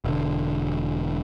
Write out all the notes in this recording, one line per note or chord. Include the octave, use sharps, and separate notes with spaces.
E1 D3